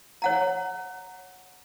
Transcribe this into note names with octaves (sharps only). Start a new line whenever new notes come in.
C#5 F#5 A#5